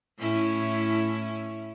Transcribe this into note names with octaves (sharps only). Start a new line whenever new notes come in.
A2 C#4 E4